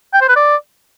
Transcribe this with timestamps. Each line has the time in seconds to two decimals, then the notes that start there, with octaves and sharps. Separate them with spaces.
0.14 G5
0.21 C5
0.29 B4
0.36 D5